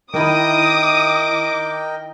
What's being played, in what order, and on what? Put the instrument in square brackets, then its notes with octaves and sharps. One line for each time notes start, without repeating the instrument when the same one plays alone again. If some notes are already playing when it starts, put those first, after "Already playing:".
[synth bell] D#3 E4 [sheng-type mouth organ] A#4 D#5 G5 [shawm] D6 [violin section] D#6